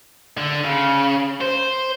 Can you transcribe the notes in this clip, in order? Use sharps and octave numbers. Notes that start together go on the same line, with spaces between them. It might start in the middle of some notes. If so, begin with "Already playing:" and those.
D3
C#3
C5